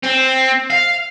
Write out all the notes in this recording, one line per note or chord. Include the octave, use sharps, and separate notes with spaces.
C4
F5